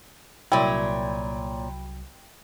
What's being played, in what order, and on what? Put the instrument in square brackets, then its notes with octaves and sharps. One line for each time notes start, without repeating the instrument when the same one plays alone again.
[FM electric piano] C2 F#3 [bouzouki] A#2 C#5 [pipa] E4 [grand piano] G5